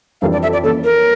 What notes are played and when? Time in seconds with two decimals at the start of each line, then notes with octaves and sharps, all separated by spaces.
0.21 F2 E3 G3 D4 A4 F5
0.32 D5
0.42 E5
0.53 D5
0.63 E3 A#3 C#4 A4
0.84 A#4